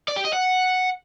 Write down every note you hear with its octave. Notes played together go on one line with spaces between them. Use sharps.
D5
G4
D#5
F#5